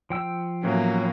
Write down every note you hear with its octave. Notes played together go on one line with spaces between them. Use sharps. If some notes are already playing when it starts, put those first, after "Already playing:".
F3 G5 E6
A2 E3 F#3 A#3 B3 C#4